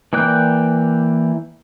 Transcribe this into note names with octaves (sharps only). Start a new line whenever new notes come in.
E3 A#3 D5 G5 F#6